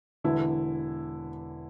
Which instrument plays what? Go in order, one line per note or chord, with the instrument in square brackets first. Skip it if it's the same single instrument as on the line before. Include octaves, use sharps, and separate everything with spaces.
[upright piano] E1 E2 D3 E4